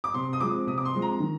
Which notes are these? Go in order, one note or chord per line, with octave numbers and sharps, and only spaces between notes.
D6
C3 C6
D#6
F3 G#3 C4 D6
C3 D#6
D6
C6
F3 G#3 C4
A#5
D#3